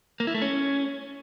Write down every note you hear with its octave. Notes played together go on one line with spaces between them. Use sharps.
A#3
E4
A3
C#4